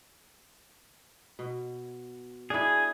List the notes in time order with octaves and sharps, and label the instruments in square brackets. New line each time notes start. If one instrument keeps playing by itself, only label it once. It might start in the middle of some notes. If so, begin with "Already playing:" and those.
[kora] B2
[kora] D4 E4 [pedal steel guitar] G#4